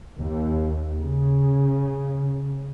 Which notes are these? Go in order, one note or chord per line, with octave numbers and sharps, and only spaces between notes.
D#2
C#3